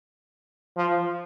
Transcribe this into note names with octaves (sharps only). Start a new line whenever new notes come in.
F3